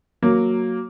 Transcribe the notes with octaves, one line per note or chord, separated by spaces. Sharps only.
F#3 A#3